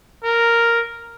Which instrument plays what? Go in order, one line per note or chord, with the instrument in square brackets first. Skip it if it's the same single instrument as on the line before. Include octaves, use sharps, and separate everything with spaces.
[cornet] A#4